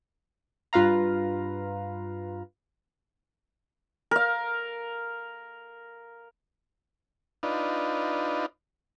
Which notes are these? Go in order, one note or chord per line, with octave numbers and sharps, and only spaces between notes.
G2 F4 B4 F5 A#5
A#4 F5
D4 D#4 F4 B4